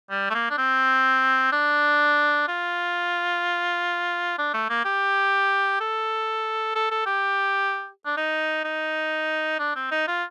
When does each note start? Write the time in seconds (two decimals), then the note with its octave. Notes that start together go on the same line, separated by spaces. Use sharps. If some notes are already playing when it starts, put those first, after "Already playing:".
0.10 G3
0.30 A3
0.35 A#3
0.50 D4
0.58 C4
1.53 D4
2.48 F4
4.38 D4
4.54 A3
4.70 A#3
4.85 G4
5.80 A4
6.76 A4
6.91 A4
7.06 G4
8.06 D4
8.17 D#4
8.65 D#4
9.59 D4
9.76 C4
9.92 D#4
10.08 F4